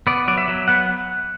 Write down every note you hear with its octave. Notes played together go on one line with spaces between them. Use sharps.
B3 D5
F#3 D5
E5
F#3
B3 F#5